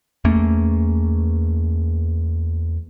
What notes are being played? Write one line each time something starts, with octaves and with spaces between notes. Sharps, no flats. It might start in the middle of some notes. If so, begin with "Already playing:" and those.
E2 A3 A#3 C#4